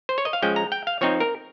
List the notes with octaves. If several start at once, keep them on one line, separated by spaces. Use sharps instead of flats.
C5
C#5
D#5
F5
F3 G#3 C#4 G5
A#5
G5
F5
F3 C4 D#4 C#5
A#4